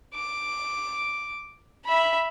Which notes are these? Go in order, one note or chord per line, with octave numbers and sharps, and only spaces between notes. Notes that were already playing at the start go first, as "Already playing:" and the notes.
D6
E5 B5